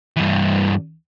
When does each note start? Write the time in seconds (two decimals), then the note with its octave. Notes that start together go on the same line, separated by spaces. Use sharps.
0.17 G2 E3